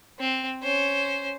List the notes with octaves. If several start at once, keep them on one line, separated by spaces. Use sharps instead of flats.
C4
C#4 C5